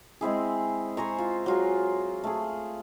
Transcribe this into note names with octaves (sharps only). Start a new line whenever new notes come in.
G#3 C4 E4 G#4
C5 G#5 A#5 C#6
F4
F#3 F4 G#4
A3 G#4